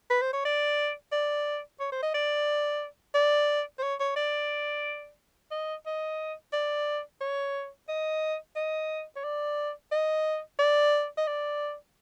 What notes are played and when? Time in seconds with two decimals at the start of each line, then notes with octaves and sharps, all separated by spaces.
0.10 B4
0.22 C5
0.33 C#5
0.45 D5
1.12 D5
1.80 C#5
1.92 C5
2.03 D#5
2.14 D5
3.15 D5
3.79 C5
3.83 C#5
4.00 C#5
4.16 D5
5.51 D#5
5.86 D#5
6.53 D5
7.21 C#5
7.89 D#5
8.56 D#5
9.16 C#5
9.24 D5
9.92 D#5
10.59 D5
11.18 D#5
11.27 D5